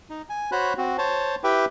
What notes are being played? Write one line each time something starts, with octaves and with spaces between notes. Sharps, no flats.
D#4
G#5
F#4 C5 C#5 B5 F#6
C4 F#4
C5 C#5 A5
E4 G4 B4 E5 G5